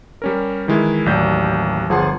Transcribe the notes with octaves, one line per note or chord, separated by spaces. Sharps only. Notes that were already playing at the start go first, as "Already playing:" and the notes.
G3 C#4 A#4
D#3 E3 G#3 E4
A1 D#2 F#3 D5 G6
G1 F3 G#4 F#5 A5 C6